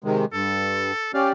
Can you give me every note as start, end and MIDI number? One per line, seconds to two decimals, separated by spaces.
0.04 0.25 48
0.04 0.25 51
0.04 0.25 56
0.33 0.92 43
0.33 1.12 69
1.14 1.32 61
1.14 1.32 67
1.14 1.32 74
1.14 1.29 77